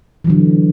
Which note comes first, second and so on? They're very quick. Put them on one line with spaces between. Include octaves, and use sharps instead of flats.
E3 F#3 D3